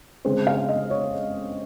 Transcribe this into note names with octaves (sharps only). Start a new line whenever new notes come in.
C#3 G#3 C4 C5
F5
D#5
C#5